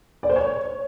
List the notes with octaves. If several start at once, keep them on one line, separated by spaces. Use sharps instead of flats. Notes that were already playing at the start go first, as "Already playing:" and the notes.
D5
C5
C#5